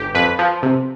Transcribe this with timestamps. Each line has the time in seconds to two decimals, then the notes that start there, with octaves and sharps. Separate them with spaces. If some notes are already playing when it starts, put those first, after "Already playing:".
Already playing: G1 G4
0.15 F2 B4
0.39 F3
0.62 C3